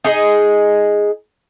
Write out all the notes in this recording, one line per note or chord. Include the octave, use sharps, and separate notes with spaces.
D#4 G#4 D#5